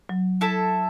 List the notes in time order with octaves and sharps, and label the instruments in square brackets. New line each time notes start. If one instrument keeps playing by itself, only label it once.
[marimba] F#3
[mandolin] E4 A4 E5 A5